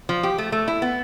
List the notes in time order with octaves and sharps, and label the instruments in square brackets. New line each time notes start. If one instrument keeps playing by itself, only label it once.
[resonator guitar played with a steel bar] F3
G4
A3
A3
E4
B3